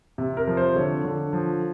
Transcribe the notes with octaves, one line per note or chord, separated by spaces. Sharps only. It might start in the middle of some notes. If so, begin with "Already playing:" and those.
C3
A#4
F3
C5
D3 C#5
D3
F3